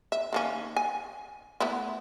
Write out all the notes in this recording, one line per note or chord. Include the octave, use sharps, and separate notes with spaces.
E5
D#3 A#3 C#4
G#5
A3 B3 E4